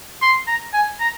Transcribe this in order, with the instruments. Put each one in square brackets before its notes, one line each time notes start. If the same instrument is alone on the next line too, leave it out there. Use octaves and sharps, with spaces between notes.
[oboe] C6
A#5
G#5
A#5